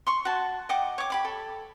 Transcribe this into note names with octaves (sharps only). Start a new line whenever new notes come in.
C6 C#6
F#4 A5
D#5 F#5 G5 D6
C#5 D6
G4 B5 D6
A4